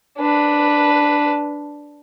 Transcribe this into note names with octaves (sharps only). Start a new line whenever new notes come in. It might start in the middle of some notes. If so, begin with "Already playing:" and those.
D4 B4